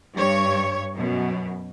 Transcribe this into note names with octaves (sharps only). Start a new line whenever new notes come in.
G2 C#5
F#2 B2